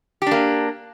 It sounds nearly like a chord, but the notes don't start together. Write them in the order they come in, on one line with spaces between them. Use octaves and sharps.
G4 D4 A#3